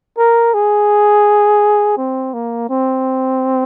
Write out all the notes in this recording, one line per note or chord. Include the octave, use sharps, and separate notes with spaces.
A#4
G#4
C4
A#3
C4